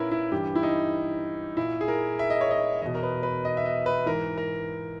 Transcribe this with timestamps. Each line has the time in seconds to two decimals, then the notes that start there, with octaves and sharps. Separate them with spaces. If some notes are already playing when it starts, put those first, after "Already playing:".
Already playing: A#2 C#4 E4 A#4 B4
0.12 E4
0.31 G2 E3 G4
0.55 E4
0.63 D#4
1.57 A#2 E4
1.81 G#4
1.88 A#4
2.19 E5
2.30 D#5
2.41 C#5
2.51 D#5
2.82 E2 B2 D#5
2.95 A#4
3.03 B4
3.23 B4
3.45 D#5
3.57 E5
3.66 D#5
3.86 B4
4.06 G#2 E3 A#4
4.38 A#4